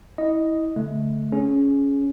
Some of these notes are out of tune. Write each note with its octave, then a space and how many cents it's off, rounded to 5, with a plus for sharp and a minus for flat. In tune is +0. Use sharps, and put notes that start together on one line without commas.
E4 -25 D#5 +0
D3 -30 A3 -15
C#4 +5 G#4 +15